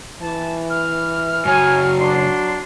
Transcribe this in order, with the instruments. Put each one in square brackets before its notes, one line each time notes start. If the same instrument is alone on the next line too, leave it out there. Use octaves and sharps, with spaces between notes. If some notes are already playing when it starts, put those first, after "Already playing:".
[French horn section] E3 [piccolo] A5
[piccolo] F6
[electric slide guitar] F#2 C#3 C#5 [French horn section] F#3 [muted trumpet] G#5
[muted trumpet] D4 [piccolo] C6